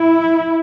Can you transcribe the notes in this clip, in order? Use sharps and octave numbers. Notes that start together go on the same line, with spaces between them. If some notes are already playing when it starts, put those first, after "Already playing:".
Already playing: E4